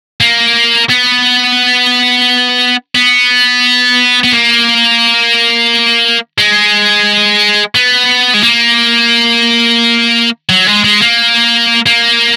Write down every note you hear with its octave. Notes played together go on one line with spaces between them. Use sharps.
A#3
B3
B3
B3
A#3
G#3
B3
G#3
A#3
F#3
G#3
G#3
A#3
A#3